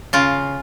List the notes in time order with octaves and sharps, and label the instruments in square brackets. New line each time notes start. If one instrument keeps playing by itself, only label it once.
[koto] C#3 F4